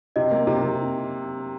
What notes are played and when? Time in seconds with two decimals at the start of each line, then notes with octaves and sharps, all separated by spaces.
0.16 C3 D#5
0.31 A#3
0.47 C3
0.62 C3